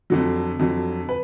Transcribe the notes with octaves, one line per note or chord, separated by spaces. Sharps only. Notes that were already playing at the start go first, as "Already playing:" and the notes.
F2 D3 F#3
F2 D3 F#3
B4